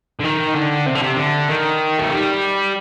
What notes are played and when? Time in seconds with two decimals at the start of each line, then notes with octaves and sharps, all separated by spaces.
0.20 D3
0.25 D#3
0.55 D3
0.87 C3
0.95 D3
1.02 C3
1.17 D3
1.49 D#3
1.98 A3
2.10 G3